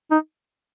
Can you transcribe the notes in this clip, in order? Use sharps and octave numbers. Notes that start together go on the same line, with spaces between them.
D#4